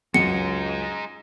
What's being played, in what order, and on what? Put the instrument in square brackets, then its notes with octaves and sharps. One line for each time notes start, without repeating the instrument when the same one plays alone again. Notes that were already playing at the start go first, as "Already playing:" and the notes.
[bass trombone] C#2 [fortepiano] F#2 [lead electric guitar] G#3 D#4 [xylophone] C#7